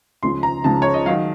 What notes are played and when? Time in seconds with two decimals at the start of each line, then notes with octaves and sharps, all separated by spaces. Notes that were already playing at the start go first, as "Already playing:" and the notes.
0.23 C#2 C#3 F3 C6
0.43 A#5
0.64 C#2 C#3 F3 A5
0.82 C#5
0.94 D#5
1.06 D#3 F#3 F5